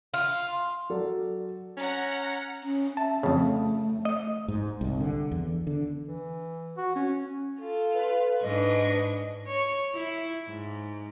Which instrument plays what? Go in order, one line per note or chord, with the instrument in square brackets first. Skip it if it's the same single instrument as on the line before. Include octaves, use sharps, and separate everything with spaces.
[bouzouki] F4
[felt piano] F#3 A4 D5
[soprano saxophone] C#4 [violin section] F#5 A#5 C#7
[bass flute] C#4
[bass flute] E5 [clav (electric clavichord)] A5
[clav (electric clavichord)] F2 C#3 [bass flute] A3
[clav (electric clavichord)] D#5
[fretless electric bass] G#2
C2
D3
E2
D3
[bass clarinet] E3
F#4
C#4
[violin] F4 A4
[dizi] B4
[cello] G#2 D4 [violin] B4 C#6 [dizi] D#5
[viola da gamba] C#5
E4
G#2